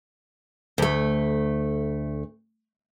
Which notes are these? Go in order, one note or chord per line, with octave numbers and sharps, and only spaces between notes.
D2 A3